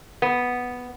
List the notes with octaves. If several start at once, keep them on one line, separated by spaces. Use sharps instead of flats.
B3